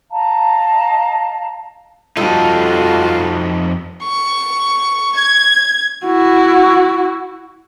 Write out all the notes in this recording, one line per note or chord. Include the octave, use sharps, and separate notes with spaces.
D#5 F5 A5 A#5
F2 G3 D#4 F4 F#4 A4
C#6
G#6
E4 F#4